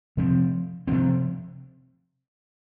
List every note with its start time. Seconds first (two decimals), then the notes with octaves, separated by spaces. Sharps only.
0.17 C3 F3 C4
0.87 C3 F3 C4